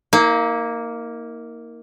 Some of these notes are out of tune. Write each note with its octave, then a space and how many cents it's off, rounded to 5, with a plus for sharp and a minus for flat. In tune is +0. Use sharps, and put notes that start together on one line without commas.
A#3 +0 D#4 +45